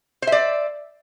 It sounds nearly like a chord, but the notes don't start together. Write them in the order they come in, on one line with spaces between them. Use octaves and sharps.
C5 E5 D5